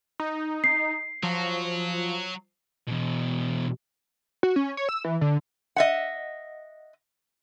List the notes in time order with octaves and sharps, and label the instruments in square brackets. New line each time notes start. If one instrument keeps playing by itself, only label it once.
[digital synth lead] D#4
[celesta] C7
[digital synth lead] F3 [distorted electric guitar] F#3
[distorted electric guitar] E2 B2
[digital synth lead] F#4
C#4
C#5
E6
E3
D3
[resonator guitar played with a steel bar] D#5 E5 F#5